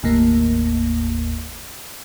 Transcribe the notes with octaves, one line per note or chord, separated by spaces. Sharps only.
G1 D#2 A2 A#3